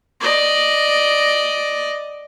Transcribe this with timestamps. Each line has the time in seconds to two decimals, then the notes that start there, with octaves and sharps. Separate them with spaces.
0.21 D5 D#5